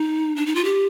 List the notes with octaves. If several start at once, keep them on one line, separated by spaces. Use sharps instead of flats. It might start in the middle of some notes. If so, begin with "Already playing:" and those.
Already playing: D#4
D4
D#4
F4
G4